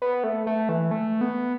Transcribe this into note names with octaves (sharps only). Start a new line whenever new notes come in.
B3
A3
A3
E3
A3
B3